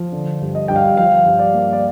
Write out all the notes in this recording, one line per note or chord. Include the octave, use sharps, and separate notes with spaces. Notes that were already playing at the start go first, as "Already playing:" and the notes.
Already playing: F3
D3
G2
D#5
G2 G5
F5
F3 F5
G2
D5
A#3
D5